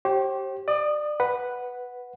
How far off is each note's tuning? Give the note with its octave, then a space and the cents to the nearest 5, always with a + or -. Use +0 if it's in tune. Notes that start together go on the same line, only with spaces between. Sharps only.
G4 -20 C5 +40
D5 +25 D#6 -20
B4 +0 F#5 +0